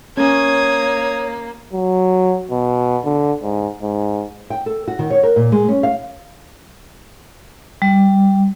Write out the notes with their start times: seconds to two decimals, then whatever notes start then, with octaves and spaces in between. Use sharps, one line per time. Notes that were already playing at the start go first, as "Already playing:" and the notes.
0.17 A#3 C#4 C#5 D#6 G#6
1.73 F#3
2.51 B2
3.05 D3
3.42 G#2
3.82 G#2
4.50 G5
4.66 A4
4.87 F#4
4.99 D#3
5.10 C#5
5.23 A#4
5.36 A#2
5.52 G#3
5.68 C#4
5.83 F5
7.82 G3